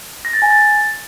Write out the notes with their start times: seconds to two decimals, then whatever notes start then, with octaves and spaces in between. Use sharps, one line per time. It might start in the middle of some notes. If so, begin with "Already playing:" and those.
0.25 A#6
0.33 A6
0.42 G#5
0.51 A6